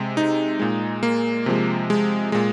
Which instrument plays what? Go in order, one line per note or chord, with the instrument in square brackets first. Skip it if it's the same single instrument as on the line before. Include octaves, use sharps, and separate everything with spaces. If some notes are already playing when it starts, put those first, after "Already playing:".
Already playing: [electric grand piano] C3 G#3
D#4
A#2 G#3
A#3
C3 F3 G#3
G#3
A#2 G#3